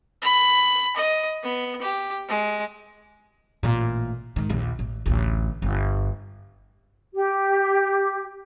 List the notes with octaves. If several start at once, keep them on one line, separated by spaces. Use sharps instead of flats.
B5
D#5
B3
G4
G#3
A1 A#2
G#2 D#3
A#1 D#2
A1
A1 D2
G1
G4